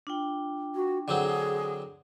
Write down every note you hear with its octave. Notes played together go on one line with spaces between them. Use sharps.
D4 F4 G5
F#4
D3 F#3 C4 G#4